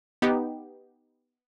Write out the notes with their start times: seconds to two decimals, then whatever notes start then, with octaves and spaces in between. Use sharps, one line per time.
0.22 B3 D#4 G4